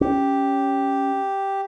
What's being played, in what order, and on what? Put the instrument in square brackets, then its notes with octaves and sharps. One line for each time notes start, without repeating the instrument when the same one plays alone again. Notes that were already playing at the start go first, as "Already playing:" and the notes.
[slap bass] C#4 [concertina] G4